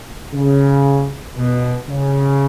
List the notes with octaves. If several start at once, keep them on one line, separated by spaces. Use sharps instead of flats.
C#3
B2
C#3